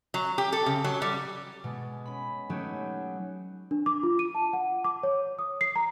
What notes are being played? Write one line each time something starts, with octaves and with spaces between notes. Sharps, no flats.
F#3
G4
A4
C#3
F#3
G3
B2 G#3
C#4 B5
F#3 A3 C#4 D#4 F#4 G4
D4
D6
F4
D#7
A5
F#5
D6
C#5
D#6
C7
A#5